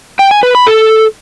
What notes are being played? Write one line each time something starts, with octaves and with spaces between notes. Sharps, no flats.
G5
G#5
B4
B5
A4